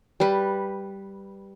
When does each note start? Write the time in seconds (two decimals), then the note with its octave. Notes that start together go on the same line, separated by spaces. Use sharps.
0.20 G3 B4